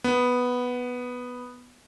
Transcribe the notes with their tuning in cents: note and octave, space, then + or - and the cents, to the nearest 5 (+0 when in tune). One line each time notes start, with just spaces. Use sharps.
B3 +0